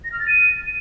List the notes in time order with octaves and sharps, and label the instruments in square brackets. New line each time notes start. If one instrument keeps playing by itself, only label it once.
[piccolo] A#6
F6
A6
D#7